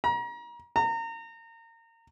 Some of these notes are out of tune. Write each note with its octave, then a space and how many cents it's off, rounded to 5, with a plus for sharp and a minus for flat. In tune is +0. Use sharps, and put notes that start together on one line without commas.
A#5 +35
A#5 -30